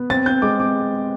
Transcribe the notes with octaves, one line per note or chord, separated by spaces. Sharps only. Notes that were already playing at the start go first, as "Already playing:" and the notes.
Already playing: B3
C4 A6
C4 G6
G#3 D6
C4 D6